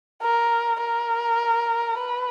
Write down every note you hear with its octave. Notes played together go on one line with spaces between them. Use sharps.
A#4
A#4
B4